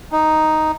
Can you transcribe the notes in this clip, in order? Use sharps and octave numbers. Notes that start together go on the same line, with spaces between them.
D#4